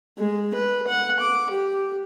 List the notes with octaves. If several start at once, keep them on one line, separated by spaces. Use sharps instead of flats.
G#3
B4
F#5
D6
G4